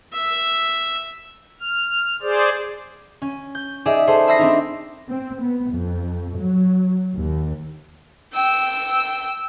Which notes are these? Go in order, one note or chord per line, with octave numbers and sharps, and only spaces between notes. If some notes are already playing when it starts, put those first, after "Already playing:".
E5
F6
G#4 C5 D5
C#4
G6
D#4 G#4 D5 E5
G#4 A4 C5
E5 B5 D#6 E6 A#6 C7
C4 D4 D#4
C4
B3
F2
F#3
D#2
G5 E6